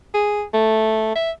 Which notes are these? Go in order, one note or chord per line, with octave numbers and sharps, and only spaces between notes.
G#4
A3
E5